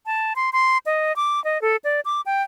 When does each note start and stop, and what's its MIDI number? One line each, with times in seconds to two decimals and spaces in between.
0.06 0.33 81
0.36 0.50 84
0.53 0.78 84
0.86 1.15 75
1.16 1.42 86
1.44 1.61 75
1.62 1.76 69
1.84 2.00 74
2.05 2.21 86
2.26 2.43 79